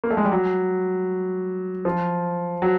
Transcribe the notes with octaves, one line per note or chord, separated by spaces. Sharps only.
A#3
A3
G#3
G3
F#3
F3
F#3